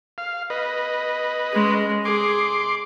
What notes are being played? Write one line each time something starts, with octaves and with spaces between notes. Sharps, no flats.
F5
B4 D#5
G#3 C#4
G#4 C6 D6